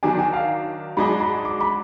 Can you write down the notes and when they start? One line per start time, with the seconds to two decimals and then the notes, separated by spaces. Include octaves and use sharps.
0.03 D#3 F#3 D4 G#5
0.19 G#5
0.33 F5
0.97 G#2 F#3 D4 G#4 D#5 B5
1.20 B5
1.45 D6
1.61 B5